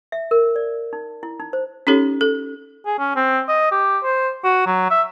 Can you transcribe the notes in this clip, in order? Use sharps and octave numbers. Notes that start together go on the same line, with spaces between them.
E5
A#4
D5
D#4
E4
D#4
C5
C#4 D#4 G4 A4 C#5
A4
G#4
C#4
C4
D#5
G4
C5
F#4
F#3
E5